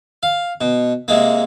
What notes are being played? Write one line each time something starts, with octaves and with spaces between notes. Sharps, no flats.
F5
B2
C3 G#3 A#3